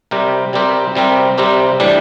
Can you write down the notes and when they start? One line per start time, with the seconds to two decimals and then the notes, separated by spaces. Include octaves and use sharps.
0.11 C3 G3 C4 G4 A#4
0.53 C3 G3 C4 G4 A#4
0.95 C3 G3 C4 G4 A#4
1.38 C3 G3 C4 G4 A#4
1.80 A2 E3 G3 D4